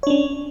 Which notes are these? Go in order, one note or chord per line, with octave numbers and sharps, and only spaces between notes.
C#4 D4 C#5